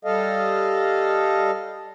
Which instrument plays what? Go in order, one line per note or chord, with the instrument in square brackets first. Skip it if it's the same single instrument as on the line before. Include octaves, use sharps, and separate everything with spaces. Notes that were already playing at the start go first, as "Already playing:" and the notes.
[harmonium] G3 A4 D#5 F5